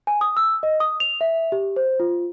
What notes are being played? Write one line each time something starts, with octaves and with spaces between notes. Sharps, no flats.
G#5
D#6
E6
D#5
D#6
F7
E5
G4
C5
F4